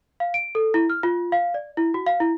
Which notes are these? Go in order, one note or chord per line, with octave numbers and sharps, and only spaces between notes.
F5
D7
A4
E4
F6
F4
F5
D5
E4
F#4
F5
E4